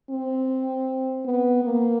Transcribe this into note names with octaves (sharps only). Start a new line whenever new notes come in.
C4
B3
A#3